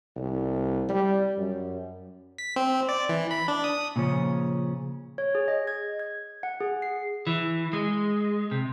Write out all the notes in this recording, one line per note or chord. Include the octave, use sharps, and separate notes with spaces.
C2
G3
F#2
B6
C4
D5
E3
B5
D4
D#6
A#2 C#3 F3 C#4
C#5
G#4
D#5
G#6
G#6
F#5
G#4
C7
E3
G#3
C3